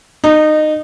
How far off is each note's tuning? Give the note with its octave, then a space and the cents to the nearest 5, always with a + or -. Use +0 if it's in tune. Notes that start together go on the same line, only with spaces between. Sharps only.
D#4 -20